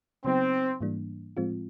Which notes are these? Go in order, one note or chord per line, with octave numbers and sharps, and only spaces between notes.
C#3 F#3 B3 C4 D#4
G#2 E3 G3 A#3 D4
A2 F3 G#3 C4 F4